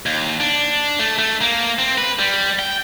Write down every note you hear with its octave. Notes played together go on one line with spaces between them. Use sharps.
D#2
D4
A3
A3
A#3
C4
B4
G3
G5